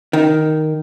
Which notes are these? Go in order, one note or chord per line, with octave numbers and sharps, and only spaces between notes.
D#3